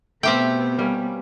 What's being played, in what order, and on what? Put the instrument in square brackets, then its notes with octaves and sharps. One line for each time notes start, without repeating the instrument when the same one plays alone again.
[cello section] B2 B3 [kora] A3 F5 [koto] C4 G4 G5
[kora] G3 A#3 C#4